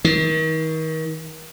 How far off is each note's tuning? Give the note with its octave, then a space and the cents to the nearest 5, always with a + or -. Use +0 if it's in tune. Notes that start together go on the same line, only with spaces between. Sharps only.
D#3 +35